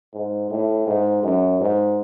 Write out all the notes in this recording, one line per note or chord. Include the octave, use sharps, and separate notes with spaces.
G#2
A2
G#2
F#2
G#2